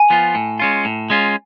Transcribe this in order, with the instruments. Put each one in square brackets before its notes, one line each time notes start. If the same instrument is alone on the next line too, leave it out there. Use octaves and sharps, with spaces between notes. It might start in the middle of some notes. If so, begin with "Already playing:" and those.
Already playing: [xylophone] G#5
[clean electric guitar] F3 B3 F4
A2
G#3 C#4 F4
A2
G#3 C#4 F4